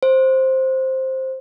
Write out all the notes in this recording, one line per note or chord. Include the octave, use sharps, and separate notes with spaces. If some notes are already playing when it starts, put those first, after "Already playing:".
C5